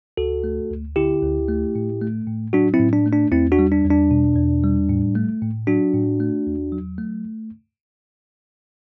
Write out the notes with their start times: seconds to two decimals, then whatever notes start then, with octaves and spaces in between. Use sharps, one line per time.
0.17 D2 F#4 A4
0.44 A3
0.70 D2
0.96 D3 E4 G4
1.23 D2
1.48 A3
1.75 A2
2.02 A3
2.27 A2
2.53 F#3 D4 F#4
2.74 C4 E4
2.79 A2
2.93 D4
3.06 A3
3.13 D4
3.32 E2 C4 E4
3.52 D4 F#4
3.59 G3
3.72 D4
3.85 E2
3.90 D4
4.11 B2
4.36 E2
4.63 G3
4.89 A2
5.15 A3
5.42 A2
5.67 F#3 D4 F#4
5.94 A2
6.20 A3
6.47 E2
6.72 F#3
6.98 A3